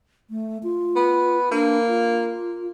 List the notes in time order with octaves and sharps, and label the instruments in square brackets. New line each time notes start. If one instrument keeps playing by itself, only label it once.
[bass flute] A3
F4
[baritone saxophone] B3
[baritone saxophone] A#3 [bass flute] D4
[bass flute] F4